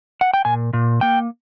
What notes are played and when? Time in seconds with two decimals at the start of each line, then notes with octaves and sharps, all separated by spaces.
0.21 F#5
0.34 G5
0.45 A#2 G#5
0.73 A#2
1.01 A#3 G5